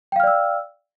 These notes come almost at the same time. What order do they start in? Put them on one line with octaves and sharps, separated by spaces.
G5 F5 F6 D5 E6